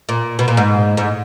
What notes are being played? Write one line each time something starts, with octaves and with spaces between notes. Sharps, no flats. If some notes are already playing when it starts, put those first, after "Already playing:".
A#2
B2
A#2
G#2
G#2